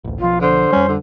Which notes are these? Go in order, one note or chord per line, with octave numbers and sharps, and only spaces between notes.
A1 D2
B1 B2 F3 F4
D3 C5
F2 G3 C#4
D3